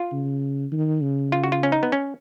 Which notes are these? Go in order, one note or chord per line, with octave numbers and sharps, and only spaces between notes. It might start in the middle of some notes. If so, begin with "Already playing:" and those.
Already playing: F4
C#3
D#3
C#3
F4
F#4
F4
C#4
D#4
B3
C#4